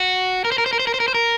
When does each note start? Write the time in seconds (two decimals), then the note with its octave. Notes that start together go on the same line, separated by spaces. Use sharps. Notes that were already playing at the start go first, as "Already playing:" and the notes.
Already playing: F#4
0.45 A#4
0.52 C5
0.58 A#4
0.66 C5
0.73 A#4
0.79 C5
0.87 A#4
0.94 C5
1.00 A#4
1.08 C5
1.14 A#4